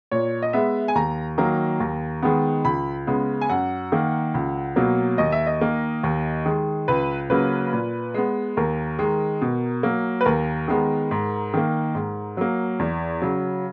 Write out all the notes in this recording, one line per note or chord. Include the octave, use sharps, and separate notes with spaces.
A#2 C#5
D#5
G#3 B3 E5
G#5
D#2 A#5
D#3 F#3 A#3 A#5
D#2
D#3 G#3 B3
C#2 B5
C#3 G#3 B3
G#5
F#2 F#5
D#3 A#3
C#2
B2 F#3 A#3
D#2 D#5
E5
D#5
D#3 A#3
D#2
D#3 G#3
C#2 B4
C#3 F#3 A#3 B4
A#2
G#3 B3
D#2 A#4
D#3 G#3
B2
F#3 A#3
B4
D#2 A#4
D#3 G#3 B3
G#2
D#3 A#3
G#2
F#3 A#3
E2
C#3 F#3